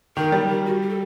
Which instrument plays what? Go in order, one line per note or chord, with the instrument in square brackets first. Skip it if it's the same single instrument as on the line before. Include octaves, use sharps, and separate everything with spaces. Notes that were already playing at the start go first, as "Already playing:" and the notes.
[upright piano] D#3 [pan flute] A#4
[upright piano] G3
[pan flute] G4
F#4
G4
A4